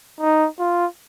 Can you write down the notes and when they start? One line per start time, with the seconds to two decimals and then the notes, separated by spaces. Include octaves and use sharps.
0.20 D#4
0.59 F4